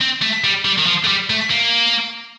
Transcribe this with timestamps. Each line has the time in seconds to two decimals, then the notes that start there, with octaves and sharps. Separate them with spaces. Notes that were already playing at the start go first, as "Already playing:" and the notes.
0.01 C4
0.21 A3
0.44 G3
0.65 G3
0.78 D#3
0.87 F3
1.04 A3
1.08 G3
1.30 A3
1.50 A#3